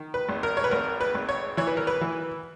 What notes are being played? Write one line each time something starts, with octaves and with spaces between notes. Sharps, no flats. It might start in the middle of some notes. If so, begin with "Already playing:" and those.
Already playing: D#3
B4
G#1
A#4
C#5
B4
G#1 A#4
B4
G#1
C#5
E3 C#5
B4
A#4
B4
E3